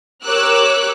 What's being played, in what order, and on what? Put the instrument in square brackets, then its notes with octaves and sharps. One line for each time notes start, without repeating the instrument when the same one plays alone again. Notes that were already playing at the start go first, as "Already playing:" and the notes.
[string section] G4 A#4 C#5 D6 E6 F#6